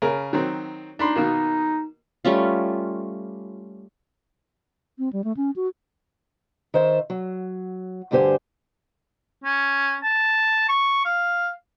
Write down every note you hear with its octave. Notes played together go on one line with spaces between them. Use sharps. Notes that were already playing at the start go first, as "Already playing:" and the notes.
C#3 A#4
D#3 F#3 C4
D4 D#4 B5 C6
B2 D#3 A#3
G3 A3 C#4 F4
C4
G3
A3
C#4
F#4
D#3 C5 E5
F#3
D2 G2 D3 G4 C5 G#5
C#4
A5
C#6
F5